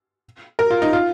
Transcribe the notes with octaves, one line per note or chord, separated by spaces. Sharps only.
A#4
F4
D#4
F4